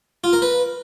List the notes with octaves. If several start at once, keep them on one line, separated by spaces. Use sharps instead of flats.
F4
A#4
B4